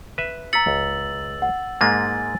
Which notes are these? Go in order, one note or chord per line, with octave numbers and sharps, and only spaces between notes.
B4 E5
A#5 E6 A6 B6 C#7 F#7
C#2
F#5
G#2 G#3 A#3 G#5 A6